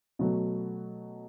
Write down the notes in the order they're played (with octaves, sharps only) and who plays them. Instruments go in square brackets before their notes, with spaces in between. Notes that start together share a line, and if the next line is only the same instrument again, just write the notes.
[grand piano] B2 F#3 A3